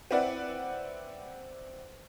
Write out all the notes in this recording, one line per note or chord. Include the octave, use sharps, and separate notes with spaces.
C4 E4 B4 D5 F#5